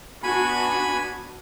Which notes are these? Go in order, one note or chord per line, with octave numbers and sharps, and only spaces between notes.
B3 D4 F#4 G#5 B5